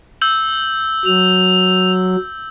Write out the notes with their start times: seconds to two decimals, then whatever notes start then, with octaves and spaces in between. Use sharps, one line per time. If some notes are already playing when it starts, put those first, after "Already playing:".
0.21 E6 G6 F#7
1.06 F#3 F7